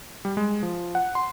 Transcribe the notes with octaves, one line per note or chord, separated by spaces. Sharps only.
G3
G#3
F3
F#5
C6